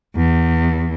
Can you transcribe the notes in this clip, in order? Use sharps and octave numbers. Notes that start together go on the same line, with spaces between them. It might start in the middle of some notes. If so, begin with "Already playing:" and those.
E2